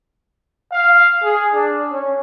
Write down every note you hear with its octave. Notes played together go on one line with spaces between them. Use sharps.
F5
G#4
D4
C#4